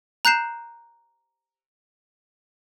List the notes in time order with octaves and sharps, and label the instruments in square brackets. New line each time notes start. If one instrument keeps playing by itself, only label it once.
[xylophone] A#5 F#6 G6 C7 E7